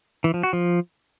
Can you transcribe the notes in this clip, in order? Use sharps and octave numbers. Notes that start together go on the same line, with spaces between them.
E3
F3
F#4
F3